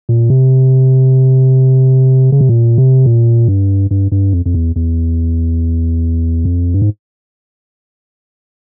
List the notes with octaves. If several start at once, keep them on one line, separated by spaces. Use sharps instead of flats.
A#2
C3
C#3
C3
A#2
C3
A#2
G2
G2
G2
F2
F2
E2
E2
F2
G2
G#2